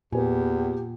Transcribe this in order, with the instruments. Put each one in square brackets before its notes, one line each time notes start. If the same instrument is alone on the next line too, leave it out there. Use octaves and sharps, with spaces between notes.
[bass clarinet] E2 [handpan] A#2 [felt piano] B3 B4 G#5 [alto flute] G4